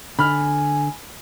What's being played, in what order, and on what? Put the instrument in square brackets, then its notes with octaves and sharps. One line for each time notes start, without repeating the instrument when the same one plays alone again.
[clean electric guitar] D3 [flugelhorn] G#5 [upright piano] B5 F6